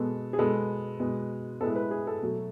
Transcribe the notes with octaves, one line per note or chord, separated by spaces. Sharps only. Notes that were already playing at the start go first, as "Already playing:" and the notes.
Already playing: B2 G#3 B3 A4
G#4
B2 G#3 B3 A4
B2 G#3 B3
A2 G#3 B3 A4
B4
G#4
A4
B2 F#3 A3